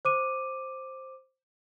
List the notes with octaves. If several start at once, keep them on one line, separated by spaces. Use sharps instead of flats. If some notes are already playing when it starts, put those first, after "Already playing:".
C5 D6 D#7